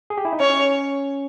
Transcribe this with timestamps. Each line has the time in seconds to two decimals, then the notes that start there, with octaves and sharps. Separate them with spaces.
0.10 G#4
0.18 G4
0.25 E4
0.33 D#4
0.40 C#4 C#5